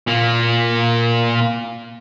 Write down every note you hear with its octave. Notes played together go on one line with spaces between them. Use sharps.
A#2 A#3